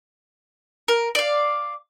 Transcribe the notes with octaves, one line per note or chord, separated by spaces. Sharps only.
A#4
D5 F5